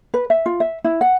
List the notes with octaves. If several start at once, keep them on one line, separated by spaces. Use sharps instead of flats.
B4
E5
F4
E5
E4
F#5